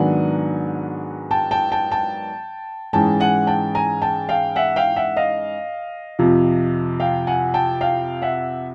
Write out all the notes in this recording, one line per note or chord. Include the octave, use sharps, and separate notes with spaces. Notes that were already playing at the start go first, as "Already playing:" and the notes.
Already playing: G#2 D#3 F#3 B3 D4 F#5 G#5
G5 A5
G5 A5
G5 A5
G5 A5
G#2 E3 G#3 C#4 G5 A5
F#5 G#5
G5 A5
G#5 A#5
G5 A5
F5 G5
E5 F#5
F5 G5
E5 F#5
D#5 F5
F2 C3 F3
F5 G5
F#5 G#5
G5 A5
F5 G5
E5 F#5